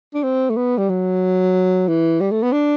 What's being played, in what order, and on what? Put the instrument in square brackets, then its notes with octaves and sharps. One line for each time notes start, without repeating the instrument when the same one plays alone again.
[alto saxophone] D4
C4
A3
B3
G3
F#3
E3
G3
A3
B3
D4